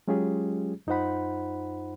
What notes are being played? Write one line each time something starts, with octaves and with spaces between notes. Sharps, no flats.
F#3 G#3 C#4 F4 G4 G#4
F#2 D#4 F4 C5 F#5 B5